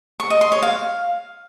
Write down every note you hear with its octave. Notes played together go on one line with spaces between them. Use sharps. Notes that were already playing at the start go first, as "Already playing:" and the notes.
C#6
D#5
C6
C#5
F5